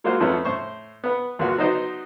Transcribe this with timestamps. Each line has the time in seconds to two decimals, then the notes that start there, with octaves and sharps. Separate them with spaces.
0.04 F#3 G#3 A#3 F4 F#4 C5
0.20 F2 F3 A3 B3 C#4
0.45 A2 C5 C#6
1.04 B3 B4
1.39 D2 A#3 B3 F4 F#4
1.58 F#3 B3 D#4 C5 D5